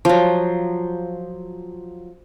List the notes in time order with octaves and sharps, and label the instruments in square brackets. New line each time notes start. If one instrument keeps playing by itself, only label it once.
[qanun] F3 F#3